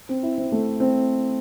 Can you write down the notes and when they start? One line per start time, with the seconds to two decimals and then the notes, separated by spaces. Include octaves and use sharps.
0.09 C4
0.23 E4
0.38 C4
0.52 A3
0.80 C4